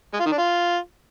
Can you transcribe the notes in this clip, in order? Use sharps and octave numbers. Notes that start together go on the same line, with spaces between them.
G#3
F4
D#3
D4
F4